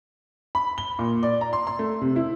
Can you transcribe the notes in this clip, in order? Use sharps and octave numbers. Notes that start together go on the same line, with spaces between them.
B5
G7
A#2
D5
A#5
C6
C6
A3
C3
E4